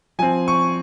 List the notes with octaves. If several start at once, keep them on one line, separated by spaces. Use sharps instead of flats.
F3 C4 G#5
C#6